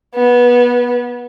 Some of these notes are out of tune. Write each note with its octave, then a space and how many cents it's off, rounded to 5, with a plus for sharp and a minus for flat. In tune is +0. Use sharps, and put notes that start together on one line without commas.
B3 -20